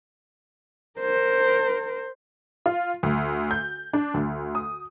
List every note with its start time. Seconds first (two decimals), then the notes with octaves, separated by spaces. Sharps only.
1.00 A#4 C5
2.66 F4
3.03 D2
3.51 G6
3.93 D4
4.14 D2
4.55 D#6